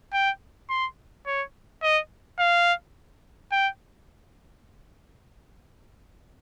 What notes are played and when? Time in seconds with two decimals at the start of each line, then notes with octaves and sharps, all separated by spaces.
0.13 G5
0.70 C6
1.26 C#5
1.83 D#5
2.39 F5
3.52 G5